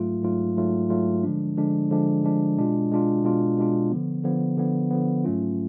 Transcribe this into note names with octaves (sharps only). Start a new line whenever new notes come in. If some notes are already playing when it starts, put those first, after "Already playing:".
Already playing: G#2 F#3 A3 F4
G#2 F#3 A3 F4
G#2 F#3 A3 F4
G#2 F#3 A3 F4
D3 F3 G#3 D4
D3 F3 G#3 D4
D3 F3 G#3 D4
D3 F3 G#3 D4
B2 G#3 D4 F4
B2 G#3 D4 F4
B2 G#3 D4 F4
B2 G#3 D4 F4
D3 F3 B3
D3 F3 B3
D3 F3 B3
D3 F3 B3
G#2 F#3 A3 C#4 F4